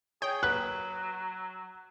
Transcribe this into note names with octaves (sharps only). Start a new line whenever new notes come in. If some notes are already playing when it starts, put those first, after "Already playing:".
G#4 C#5 G5
F#3 B4 F#6